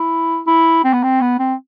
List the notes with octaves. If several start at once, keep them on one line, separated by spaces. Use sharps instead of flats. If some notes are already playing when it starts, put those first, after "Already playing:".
Already playing: E4
E4
C4
B3
C4
B3
C4